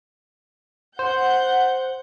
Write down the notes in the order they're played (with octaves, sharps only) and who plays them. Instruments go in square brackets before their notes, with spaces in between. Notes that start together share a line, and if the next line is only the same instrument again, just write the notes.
[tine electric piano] C5 [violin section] F#5 G6